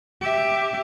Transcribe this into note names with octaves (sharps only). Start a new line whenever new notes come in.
G4 E5